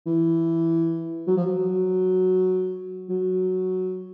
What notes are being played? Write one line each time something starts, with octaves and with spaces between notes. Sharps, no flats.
E3
F#3
F3
F#3
F#3